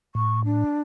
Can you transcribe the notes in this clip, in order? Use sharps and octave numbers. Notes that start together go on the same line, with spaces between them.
A2 C#6
D4